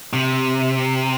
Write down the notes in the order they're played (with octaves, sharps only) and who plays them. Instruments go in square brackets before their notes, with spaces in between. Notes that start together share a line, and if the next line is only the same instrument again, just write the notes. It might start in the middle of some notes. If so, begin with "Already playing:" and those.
[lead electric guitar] C3